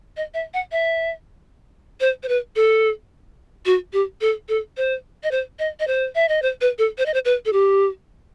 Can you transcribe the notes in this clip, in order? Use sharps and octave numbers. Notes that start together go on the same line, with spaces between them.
D#5
E5
F#5
E5
C5
C5
B4
A4
F#4
G4
A4
A4
C5
D#5
C5
D#5
D#5
C5
E5
D#5
C5
B4
A4
C5
D#5
C5
B4
A4
G4